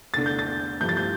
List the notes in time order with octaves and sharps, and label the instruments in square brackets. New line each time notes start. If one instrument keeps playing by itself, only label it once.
[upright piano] E2 D3 A3 D4 A6
G6
A6
G2 F3 A3 E4 G6
A6
G6